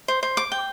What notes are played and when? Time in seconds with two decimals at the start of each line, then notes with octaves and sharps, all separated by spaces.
0.08 C5
0.23 C5
0.37 D6
0.52 G5